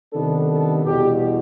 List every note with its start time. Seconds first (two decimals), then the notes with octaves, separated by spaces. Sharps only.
0.12 C3 D#3 G3 B3 D4 A4
0.49 A4
0.84 E2 B2 G3 G4